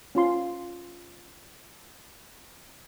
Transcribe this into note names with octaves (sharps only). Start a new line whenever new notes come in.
C#4 F4 C6